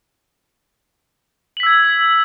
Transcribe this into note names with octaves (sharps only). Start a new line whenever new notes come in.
E6 G#6 B6 F#7